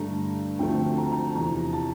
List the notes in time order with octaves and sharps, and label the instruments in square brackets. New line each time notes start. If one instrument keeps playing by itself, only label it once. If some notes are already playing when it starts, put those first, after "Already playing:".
Already playing: [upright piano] G2 D3 A3 A#5
D2 D3 F3 A3 C4 G5
A#5
A5
A#5
E2 C3 F3 A#5
A5